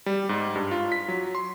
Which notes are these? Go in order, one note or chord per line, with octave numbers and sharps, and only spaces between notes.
G3
G#2
G2
F4
B6
F#3
C6